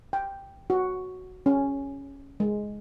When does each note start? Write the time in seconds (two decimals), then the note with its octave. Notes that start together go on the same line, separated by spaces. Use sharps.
0.13 G5
0.70 F#4
1.46 C#4
2.40 G#3